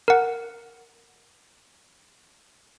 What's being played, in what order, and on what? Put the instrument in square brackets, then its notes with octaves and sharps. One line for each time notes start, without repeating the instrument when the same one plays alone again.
[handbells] A#4 F#5